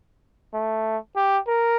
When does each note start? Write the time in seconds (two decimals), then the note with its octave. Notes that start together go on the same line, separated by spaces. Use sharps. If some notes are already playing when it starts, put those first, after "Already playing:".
0.54 A3
1.16 G4
1.48 A#4